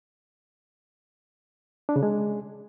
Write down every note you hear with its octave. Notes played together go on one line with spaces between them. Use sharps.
D4
C#3
G#3